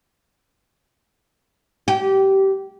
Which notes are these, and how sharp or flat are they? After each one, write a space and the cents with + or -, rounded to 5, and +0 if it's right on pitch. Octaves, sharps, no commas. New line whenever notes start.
G4 -20